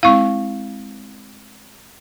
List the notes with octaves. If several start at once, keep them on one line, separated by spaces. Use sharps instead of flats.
G#3 C4 E4 F5 C#6